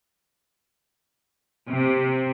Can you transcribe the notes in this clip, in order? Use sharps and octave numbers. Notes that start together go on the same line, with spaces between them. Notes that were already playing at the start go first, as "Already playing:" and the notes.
C3